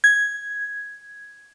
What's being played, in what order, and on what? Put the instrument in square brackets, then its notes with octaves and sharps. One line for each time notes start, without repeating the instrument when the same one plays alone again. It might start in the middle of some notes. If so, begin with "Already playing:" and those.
[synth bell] G#6